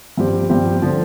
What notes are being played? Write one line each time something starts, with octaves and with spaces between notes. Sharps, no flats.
G2 F3 C4 G4
G2 F3 C4 G4
D3 F3